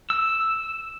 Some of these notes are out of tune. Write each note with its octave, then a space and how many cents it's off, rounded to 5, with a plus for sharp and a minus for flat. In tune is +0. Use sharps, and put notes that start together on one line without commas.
E6 +0